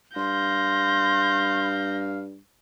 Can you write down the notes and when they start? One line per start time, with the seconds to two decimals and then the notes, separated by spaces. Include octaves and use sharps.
0.16 G2 F5 C6 G6 A#6